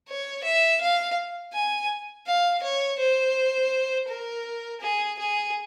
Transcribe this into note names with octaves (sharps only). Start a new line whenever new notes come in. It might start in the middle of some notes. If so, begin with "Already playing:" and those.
C#5
E5
F5
G#5
F5
C#5
C5
A#4
G#4
G#4